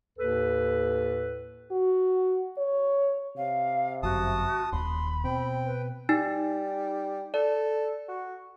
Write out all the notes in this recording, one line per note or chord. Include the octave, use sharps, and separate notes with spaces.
D#2 A2 A4 B4
F#4
C#5
C3 F5
G1 F#2 F#4 A5 D#6
D#1 D#2 B5 C6
B2 C4 G5
B4
G3 D#4 G#5
A4 D5
F#4